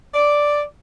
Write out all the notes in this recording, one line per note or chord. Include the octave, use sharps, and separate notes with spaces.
D5